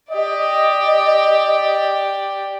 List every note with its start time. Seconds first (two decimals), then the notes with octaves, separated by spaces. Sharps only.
0.11 G4 D5 D#5